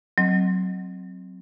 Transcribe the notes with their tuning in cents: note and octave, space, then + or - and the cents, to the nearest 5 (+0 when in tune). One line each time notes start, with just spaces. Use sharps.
F#3 +5 C4 +0 D#5 +0